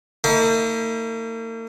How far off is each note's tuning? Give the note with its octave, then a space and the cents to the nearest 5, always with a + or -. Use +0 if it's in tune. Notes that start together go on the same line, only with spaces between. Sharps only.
A#3 -45 D#4 +45